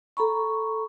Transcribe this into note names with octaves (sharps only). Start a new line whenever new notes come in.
A4 A#5 B5 C#6